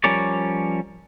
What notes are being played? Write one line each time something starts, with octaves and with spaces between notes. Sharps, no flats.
F3 G3 C#4 A#4 C#5 D5